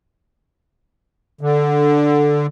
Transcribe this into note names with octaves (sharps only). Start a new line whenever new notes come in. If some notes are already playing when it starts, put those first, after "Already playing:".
D3